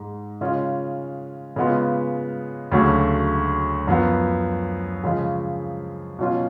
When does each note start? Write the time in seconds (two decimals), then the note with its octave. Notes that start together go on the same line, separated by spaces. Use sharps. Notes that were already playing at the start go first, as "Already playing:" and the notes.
Already playing: G#2 G#3
0.41 C#3 G#3 C#4 F4
1.56 C#3 G#3 B3 F4
2.72 D2 C#3 F#3 A3
3.87 F#2 F3 B3
5.04 C#3 F3 G#3
6.19 B2 F#3 C#4 F4